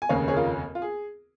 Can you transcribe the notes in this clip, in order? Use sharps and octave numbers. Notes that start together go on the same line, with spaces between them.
G#5
F1 D#2 C#3 A#3 C#4 C#5 F5
G#4 C#5
F4 A#4
F4
G#4